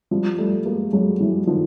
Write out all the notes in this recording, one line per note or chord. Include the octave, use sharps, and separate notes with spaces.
F3 G3
G3 A3
G#3 A#3
F#3 G#3
E3 F#3
D#3 F3